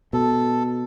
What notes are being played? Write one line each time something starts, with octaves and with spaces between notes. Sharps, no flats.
B2 A4